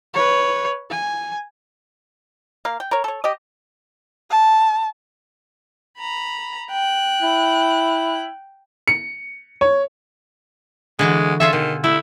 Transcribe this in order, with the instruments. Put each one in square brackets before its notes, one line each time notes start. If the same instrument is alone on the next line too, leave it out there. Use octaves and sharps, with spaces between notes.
[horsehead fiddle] B4 C#5
G#5
[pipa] A#3 F5
G5
A#4 C#5
A4 C#5
G4 D#5
[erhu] A5
[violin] A#5 B5
G5 F#6
[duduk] E4
[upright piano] C#7
C#5
[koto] D3 E3 F#4 [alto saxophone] G#3
[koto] F4 G#4 A4 [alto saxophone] E5
[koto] B2 [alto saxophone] D#3
[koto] A3 [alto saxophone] E4